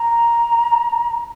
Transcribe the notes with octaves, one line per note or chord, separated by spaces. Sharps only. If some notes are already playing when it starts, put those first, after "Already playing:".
Already playing: A#5